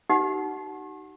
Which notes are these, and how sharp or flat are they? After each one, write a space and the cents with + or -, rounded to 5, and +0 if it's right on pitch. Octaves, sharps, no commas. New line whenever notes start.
D#4 +0 G4 -40 F#5 +0